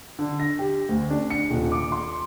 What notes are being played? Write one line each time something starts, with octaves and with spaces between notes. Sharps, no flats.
D3
A#6
G4
D2
D4
C#7
D#1
D6
C6